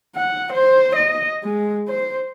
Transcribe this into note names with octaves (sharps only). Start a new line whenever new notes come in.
F#5
C5
D#5
G#3
C5